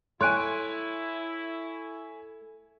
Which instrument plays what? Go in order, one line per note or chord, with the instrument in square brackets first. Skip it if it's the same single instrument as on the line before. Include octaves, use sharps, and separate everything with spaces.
[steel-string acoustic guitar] A3 [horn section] E4 [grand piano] C#5 G#5 [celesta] C6 F#6 D7